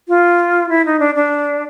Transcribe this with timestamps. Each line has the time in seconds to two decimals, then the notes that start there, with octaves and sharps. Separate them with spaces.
0.08 F4
0.69 E4
0.85 D#4
1.00 D4
1.15 D4